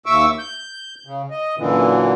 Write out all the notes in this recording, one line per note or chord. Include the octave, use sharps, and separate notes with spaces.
D#2 E5 C#6 D6 E6
G6
C#3
D#5
F#2 A#2 D3 E3